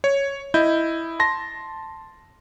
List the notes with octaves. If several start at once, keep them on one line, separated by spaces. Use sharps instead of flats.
C#5
E4 D#5 G6
A5 C6 A#6